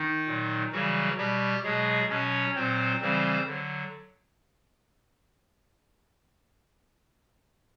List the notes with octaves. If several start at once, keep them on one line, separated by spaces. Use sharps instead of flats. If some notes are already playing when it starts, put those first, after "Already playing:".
Already playing: D#3 D#4
A#2 F#3
C#3 E3 F#3 G3 F#4
B2 G3 G4
B2 F#3 G#3 G#4
B2 F#3 C#4 C#5
A#2 F#3 C4 C5
C#3 E3 G3 C4 C5
D3 F#3